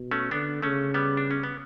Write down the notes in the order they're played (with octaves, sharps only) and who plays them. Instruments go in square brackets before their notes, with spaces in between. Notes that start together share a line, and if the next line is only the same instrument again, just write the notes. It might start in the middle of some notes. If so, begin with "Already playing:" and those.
Already playing: [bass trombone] B2
[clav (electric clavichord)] A3 C#4
[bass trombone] D3 [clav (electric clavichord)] B3 D4
[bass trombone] C#3 [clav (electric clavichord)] A3 C#4
[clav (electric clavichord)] G3 B3
D4
C#4
B3